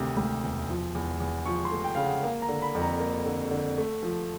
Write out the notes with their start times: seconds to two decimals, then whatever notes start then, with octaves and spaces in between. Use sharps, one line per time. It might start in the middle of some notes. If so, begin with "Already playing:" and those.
Already playing: D2 C3 D#3
0.17 D2
0.43 E1
0.69 F3
0.95 E2
1.20 E2
1.46 F3 C#6
1.65 C6
1.71 A3
1.84 G5
1.95 C#3 F5
2.04 F#5
2.23 A#3 F5
2.42 A#5
2.49 D3
2.62 B5
2.75 F2
2.81 A#5
3.00 A#3
3.26 D3
3.51 D3
3.78 A3
4.03 F3